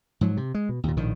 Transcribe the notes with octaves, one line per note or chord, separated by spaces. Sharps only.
G#2 F3 F#3
C3
G#3
B2
D#2 A#2
A#1 A2 D#3